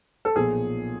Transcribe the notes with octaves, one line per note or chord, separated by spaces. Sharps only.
A4
B1 A#2 F3 G#4